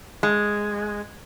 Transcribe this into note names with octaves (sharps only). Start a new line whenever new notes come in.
G#3